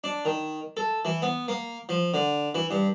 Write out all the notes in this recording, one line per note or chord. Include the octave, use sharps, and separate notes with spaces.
D4
D#3
A4
E3
B3
A#3
F3
D3
E3
G2